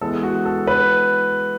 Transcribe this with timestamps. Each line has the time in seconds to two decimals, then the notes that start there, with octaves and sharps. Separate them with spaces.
0.01 E3 G#3 B3 A4
0.23 F#4
0.45 A4
0.67 B4